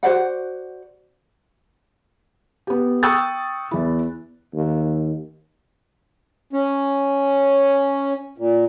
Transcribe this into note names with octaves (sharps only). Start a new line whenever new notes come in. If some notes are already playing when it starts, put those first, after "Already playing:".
F#4 C5 D5 F#5
B3 G4
G5 C#6 D#6 E6 F#6 A6
E2 E4
D#2
C#4
A#2